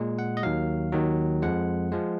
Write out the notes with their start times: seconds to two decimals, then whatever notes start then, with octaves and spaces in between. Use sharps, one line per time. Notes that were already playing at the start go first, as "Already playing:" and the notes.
Already playing: A#2 G#3
0.19 F#5
0.37 D#5
0.43 D#2 D#3 F#3 F5
0.92 D#2 D#3 F#3
1.42 F2 F3 G#3 F#5
1.92 F3 G#3